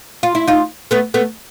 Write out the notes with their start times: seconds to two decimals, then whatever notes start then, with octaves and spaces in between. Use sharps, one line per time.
0.23 F4
0.35 E4
0.47 D#4 F4
0.91 A3 B3
1.14 A3 B3